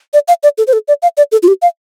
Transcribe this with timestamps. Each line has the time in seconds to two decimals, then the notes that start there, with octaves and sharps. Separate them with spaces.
0.14 D5
0.28 F5
0.43 D5
0.58 A4
0.67 C5
0.73 A4
0.88 D5
1.02 F5
1.17 D5
1.32 A4
1.43 F4
1.48 G4
1.62 F5